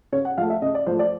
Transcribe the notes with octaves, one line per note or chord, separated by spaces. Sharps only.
C#3 C#5
F#5
F3 A3 F5
E5
C#3 D#5
D5
F3 A3 C5
D5